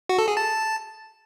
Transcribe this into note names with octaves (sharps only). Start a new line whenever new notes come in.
F#4
A4
G#4
A5